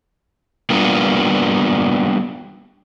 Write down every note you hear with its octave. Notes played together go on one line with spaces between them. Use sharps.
G3 A#3 B3 D4 F4